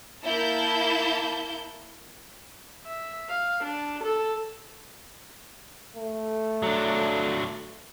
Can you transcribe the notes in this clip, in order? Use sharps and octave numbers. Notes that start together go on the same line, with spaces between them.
A#3 E4 A5 G6
E5
F5
D4
A4
A3
F#3 D4